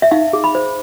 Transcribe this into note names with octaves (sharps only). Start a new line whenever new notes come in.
E5
D#4 F5
G#4
B5
C5